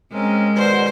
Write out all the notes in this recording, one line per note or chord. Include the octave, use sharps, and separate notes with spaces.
G#3 C4 C#4 A#4
B2 D#3 B4 C5 D5 F#5